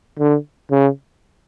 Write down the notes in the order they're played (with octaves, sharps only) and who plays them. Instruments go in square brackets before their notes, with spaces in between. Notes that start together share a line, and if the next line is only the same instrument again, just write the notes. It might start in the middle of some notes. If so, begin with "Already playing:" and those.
[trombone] D3
C#3